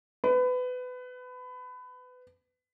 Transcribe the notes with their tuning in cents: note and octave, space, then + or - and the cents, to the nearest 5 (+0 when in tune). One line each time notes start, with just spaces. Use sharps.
B4 +25